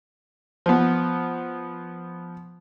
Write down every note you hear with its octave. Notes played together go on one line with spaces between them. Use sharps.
F3 B3